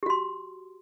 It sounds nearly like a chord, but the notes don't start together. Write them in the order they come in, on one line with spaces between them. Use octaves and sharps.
G4 F#4 C6